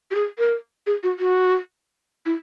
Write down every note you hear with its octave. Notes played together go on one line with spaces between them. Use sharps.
G4
G#4
A#4
G#4
F#4
F#4
E4